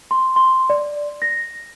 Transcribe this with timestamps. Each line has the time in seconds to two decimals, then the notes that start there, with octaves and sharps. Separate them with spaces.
0.11 C6
0.36 C6
0.70 D5
1.22 A#6